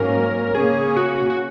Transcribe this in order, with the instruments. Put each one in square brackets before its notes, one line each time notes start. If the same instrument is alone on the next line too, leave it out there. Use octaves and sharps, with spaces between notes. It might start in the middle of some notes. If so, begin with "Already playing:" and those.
Already playing: [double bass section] G#2 F#3 A#3 C#4 [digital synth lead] A#4
[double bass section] C#3 A#3 C#4 [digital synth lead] G#4
[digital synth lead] F#4
F#4